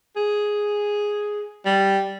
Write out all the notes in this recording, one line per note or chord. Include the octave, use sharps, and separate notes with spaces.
G#4
G3